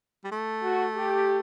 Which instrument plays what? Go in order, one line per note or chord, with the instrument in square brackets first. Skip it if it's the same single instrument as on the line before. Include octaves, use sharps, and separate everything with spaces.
[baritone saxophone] G3
A3
[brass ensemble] F#4
G4